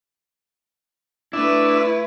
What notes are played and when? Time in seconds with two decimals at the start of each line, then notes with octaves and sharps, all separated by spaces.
1.33 A3 D4 E4 B4 E5